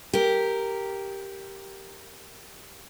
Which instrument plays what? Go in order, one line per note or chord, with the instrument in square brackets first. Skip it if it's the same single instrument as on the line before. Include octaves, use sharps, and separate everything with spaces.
[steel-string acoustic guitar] G4 A#4